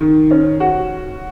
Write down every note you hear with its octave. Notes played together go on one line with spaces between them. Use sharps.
D#3
C#4
F#4